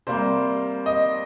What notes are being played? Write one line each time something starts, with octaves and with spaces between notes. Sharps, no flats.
C3 G3 A#3 C5
D#5